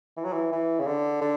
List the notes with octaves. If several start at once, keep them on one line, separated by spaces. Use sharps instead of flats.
E3
F#3
E3
E3
C#3
D3
D3